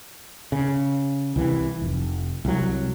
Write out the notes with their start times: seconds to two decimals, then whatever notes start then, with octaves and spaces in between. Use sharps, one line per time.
0.52 C#3
1.36 C2 E3
1.82 F1
2.45 C2 F#3